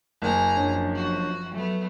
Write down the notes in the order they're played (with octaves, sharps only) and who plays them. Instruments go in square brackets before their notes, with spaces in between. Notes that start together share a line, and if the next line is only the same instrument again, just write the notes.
[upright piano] F#1 [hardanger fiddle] G#4 A#5
[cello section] F#2 F3 [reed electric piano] D4 C#5
[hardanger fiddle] F#4
[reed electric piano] F#3 [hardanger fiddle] A3 B3